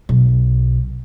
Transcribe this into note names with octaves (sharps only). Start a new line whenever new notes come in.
B1